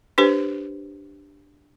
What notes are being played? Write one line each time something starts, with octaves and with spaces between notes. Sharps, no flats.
D4 G4 B4 C5